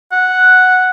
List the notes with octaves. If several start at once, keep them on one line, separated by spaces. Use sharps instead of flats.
F#5